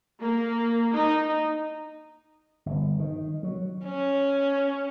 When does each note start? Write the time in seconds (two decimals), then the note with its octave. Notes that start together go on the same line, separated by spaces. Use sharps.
0.22 A#3
0.93 D#4
2.66 G1
2.99 D#3
3.43 F#3
3.85 C#4